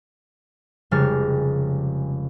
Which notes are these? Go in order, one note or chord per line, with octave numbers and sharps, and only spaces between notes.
F1 C#3 G3 G#3 F6 A6